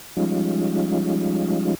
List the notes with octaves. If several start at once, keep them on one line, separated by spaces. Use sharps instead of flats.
F3 G3 G#3 C#4 D#4 F4